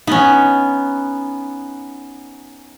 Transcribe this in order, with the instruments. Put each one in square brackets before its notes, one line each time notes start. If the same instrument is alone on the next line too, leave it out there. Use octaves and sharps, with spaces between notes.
[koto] B3 C#4 [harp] D#4